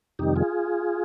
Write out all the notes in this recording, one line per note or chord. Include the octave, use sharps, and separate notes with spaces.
F2 C3 D#3 G3 D#4 G4
F4 G#4